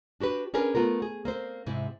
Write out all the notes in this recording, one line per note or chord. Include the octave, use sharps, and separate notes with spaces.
D4 F#4 G4 B4
C#4 D4 G#4 A#4 B4
A3 B3 F4 A#4
G#4
A#3 C4 C5
G#2 C3 E4